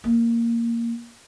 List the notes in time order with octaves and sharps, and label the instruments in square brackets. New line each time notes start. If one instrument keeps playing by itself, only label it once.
[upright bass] A#3